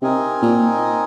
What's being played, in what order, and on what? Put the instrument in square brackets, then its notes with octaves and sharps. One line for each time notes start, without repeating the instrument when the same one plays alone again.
[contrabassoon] C3 [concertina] C4 D#4 A#4 D#5 G#5
[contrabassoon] A#2